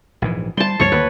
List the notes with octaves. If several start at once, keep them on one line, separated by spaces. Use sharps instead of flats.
A#1 G#2 E3
G3 A5 C6
C#2 G2 F3 C#5 C#6
D2 D#3 A#3 B4